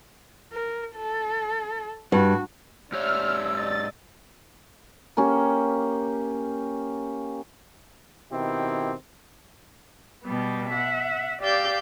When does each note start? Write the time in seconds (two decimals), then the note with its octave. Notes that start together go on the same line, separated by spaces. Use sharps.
0.52 A#4
0.96 A4
2.12 G2 F#4
2.92 G#2 G4 C#5 D5 E5 E6 F6
3.57 D5 D#5 A6
5.17 A#3 C#4 G4
8.31 B2 D#3 C4 E4 G4
10.24 B2 G3 B3
10.69 E5 F#5
11.40 G4 D5 F5 E6 G6